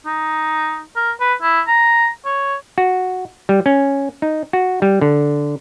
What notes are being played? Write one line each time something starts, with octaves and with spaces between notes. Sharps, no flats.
D#4
A#4
B4
E4
A#5
C#5
F#4
G3
C#4
D#4
F#4
G3
D3